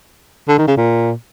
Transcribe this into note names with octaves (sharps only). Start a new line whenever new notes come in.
D3
D#3
C#3
A#2